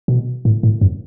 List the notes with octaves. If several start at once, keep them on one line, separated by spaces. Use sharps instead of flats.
B2
A2
A2
F#2